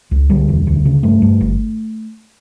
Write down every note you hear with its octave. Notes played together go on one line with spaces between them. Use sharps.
C#2
D2 G3
E1
D2
C#3
G2 A3
G2
G1